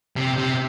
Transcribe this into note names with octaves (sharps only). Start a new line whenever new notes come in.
C3
C3